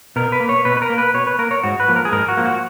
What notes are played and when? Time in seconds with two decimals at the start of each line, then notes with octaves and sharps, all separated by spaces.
0.16 B2 A#4
0.32 B4
0.40 A#3
0.49 C#5
0.65 B2 B4
0.77 B4
0.82 A#4
0.90 A#3
0.98 B4
1.14 B2 C#5
1.27 B4
1.39 A#3 A#4
1.51 C#5
1.63 G#2 F#4
1.80 B4
1.88 F3 A#3
1.96 A#4
2.05 G#4
2.12 G#2 A#4
2.28 F#4
2.37 F3 A#3
2.46 F#4